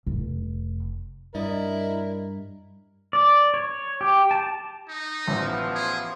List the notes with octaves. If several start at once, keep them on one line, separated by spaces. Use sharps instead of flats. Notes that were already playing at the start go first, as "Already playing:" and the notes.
F1
G2 E4 A#4 D5 D#5
D5
C#5
G4
A5
D#4
A1 F3 B3
G#4